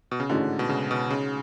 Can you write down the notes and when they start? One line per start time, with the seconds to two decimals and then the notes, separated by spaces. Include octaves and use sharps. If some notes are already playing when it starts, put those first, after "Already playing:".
0.11 B2
0.20 C#3
0.29 A1 G#2 D3 G#3 C#4 F#4
0.59 B2
0.69 C#3
0.91 B2
1.10 C#3